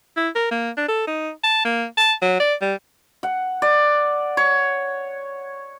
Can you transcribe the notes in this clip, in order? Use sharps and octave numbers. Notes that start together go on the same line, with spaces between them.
E4
A#4
A#3
D4
A4
D#4
A5
A#3
A5
F#3
D5
G3
F#5
D5
C#5